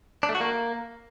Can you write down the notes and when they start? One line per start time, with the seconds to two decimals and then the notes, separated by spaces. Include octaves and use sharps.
0.23 D4
0.29 A3
0.35 F#4
0.41 A#3